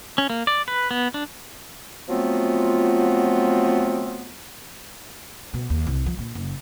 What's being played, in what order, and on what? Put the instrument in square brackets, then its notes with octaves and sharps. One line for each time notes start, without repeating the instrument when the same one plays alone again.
[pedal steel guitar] C#4
A#3
D5
B4
B3
D4
[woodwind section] F3 F#3 A3 B3 C4 F4
[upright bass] B2
D#2
C2
F3
A#2
F#1